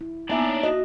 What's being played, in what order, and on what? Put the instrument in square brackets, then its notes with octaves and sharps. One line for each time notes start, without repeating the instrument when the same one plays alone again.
[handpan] E4
[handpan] A#3 E5 [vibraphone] B3 G#5 [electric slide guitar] D4 D#4 D5
[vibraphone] C#5
[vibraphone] F#4 [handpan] D#5